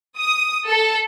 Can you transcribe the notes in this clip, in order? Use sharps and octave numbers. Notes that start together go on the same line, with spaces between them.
D#6
A4